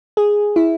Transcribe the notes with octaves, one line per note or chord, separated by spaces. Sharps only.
G#4
E4